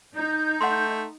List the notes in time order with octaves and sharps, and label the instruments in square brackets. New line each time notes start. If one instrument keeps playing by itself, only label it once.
[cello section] D#4 [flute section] G6
[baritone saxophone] A3 [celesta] F#5 C6